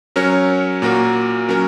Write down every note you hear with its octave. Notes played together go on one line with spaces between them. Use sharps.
F#3 C#4 A#4 C#5
A#2 A#3 F#4 A#4
F#3 C#4 A#4